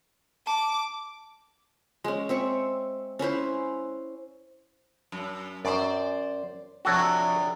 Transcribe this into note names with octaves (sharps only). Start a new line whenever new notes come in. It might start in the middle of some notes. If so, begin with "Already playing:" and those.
A5 D6
G#3 C#4
C4 E5 C#6
C#4 E4 B4 C5
F#2
F#2 C5 D5
F2 C3 D4 F#4 A4 C#5